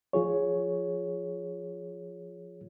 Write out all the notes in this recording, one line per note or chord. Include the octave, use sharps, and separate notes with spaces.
F3 F4 G#4 C#5